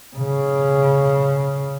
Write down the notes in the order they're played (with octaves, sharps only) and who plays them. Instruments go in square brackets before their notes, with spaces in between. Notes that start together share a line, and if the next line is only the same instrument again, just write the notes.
[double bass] C#3